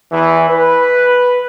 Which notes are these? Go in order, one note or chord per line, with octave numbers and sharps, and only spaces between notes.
E2 E3
B4